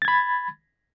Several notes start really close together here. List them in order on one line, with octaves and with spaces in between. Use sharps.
A6 G#6 B5